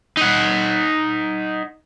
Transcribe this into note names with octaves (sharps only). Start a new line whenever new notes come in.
D#4 F#5